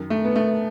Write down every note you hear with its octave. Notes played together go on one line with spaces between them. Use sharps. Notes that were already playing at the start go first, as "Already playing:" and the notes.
Already playing: F#2 D#3
A3
B3
A3